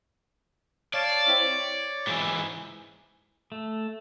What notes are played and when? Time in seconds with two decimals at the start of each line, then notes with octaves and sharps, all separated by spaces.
0.94 C#5 D5 F5 A5
1.27 C4 E4 E5
1.43 C#5
2.07 G#2 E3
3.52 A3